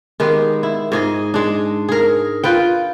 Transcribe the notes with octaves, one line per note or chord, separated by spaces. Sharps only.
D#3 G#3 B3 G4
E4
G#2 G#4 D#5
G#3 D4
G#4 A#4
F4 B4 G5